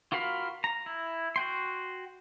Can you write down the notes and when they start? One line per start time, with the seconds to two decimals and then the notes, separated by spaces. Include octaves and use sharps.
0.12 F4 F#4 A#4 F5 B5
0.64 A#5
0.86 E4
1.36 F#4 G5 C6